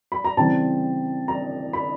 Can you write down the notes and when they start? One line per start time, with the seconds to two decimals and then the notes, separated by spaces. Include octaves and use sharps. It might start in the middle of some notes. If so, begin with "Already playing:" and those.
0.12 B5
0.24 A#5
0.37 C#3 E3 G3 C4 A5
1.28 A#5
1.73 B5